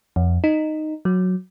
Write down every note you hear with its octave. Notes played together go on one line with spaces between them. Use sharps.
F2
D#4
F#3